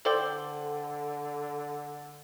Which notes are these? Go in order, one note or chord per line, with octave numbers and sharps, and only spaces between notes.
D3 A4 C5 D5 G5